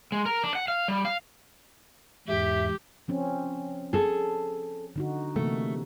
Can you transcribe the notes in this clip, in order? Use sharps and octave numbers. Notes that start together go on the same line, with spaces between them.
G#3
A#4
D4
F#5
F5
G3
F5
E2 G#2 G4 E5
F3 C4 C#4
G#4 A4
D3 D#4 F#4
C3 E3 A3 A#3